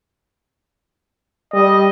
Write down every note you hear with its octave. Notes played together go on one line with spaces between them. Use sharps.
G3 D#5